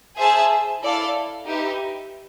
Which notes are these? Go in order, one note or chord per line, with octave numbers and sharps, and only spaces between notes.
G#4 C5 E5 A5
E4 A4 D5 F5
D#4 G4 B4 E5